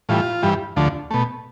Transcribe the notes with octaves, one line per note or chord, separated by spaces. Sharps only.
A2 E3 G3 F4
G2 E3 G3
D2 D3 F3 A3
B2 A3